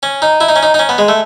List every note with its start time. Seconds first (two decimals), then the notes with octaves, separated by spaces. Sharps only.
0.03 C#4
0.22 D#4
0.41 E4
0.49 D#4
0.56 C#4
0.63 D#4
0.74 D#4
0.79 C#4
0.89 B3
0.98 G#3
1.08 A3